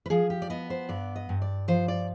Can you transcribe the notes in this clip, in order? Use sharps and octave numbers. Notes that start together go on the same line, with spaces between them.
B4
F3 G#4
G4
D5
B3 D#5
C5
G2 D5
D#5
G2
D5
F3 C5
D5